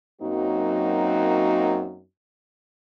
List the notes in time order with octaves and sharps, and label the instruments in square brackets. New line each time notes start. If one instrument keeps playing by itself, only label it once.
[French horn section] F#2 F#3 A#3 C4 D#4 F#4